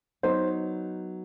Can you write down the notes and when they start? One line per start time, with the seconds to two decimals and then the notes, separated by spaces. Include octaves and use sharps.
0.23 F#3 B3 D#4 C5